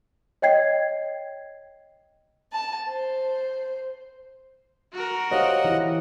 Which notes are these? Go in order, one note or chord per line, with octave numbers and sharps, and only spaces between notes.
C#5 D#5 G5 G#6 C7
A5
C5
F#4 A#4
G4 C5 C#5 D#5 F5 F#5
E3 E4